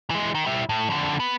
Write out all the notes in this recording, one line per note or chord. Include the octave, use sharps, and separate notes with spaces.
E3 G#3
D#3
G3 E4
A2
F2 D3
B3